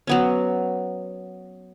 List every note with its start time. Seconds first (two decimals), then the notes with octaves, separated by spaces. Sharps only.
0.07 F#3 B3 C#4